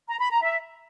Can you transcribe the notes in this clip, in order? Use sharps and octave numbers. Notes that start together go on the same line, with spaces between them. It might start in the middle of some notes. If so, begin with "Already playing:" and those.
A#5
B5
A#5
E5